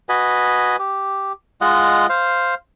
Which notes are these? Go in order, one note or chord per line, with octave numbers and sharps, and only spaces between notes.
F#4 B4 D#5 G#5
G4
G#3 F4 D#5 F#5
C5 F5